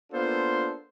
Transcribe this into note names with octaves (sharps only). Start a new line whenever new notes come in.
A#3 B3 D4 F4 A4 C5